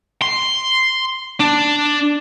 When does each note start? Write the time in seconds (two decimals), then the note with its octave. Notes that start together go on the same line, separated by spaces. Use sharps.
0.22 C6
1.40 D4